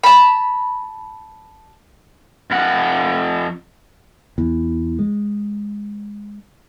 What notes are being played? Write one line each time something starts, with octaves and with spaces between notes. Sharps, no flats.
A5 B5
F2 F#5
E2
G#3